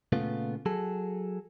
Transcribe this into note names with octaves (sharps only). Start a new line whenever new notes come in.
A#2 C#3 A3 B3 F4
F#3 G#4 A4